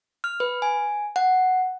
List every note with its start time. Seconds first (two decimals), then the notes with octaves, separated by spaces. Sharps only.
0.24 F6
0.40 B4
0.62 G#5
1.16 F#5